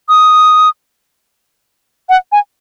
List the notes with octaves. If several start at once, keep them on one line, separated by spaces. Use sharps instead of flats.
D#6
F#5
G#5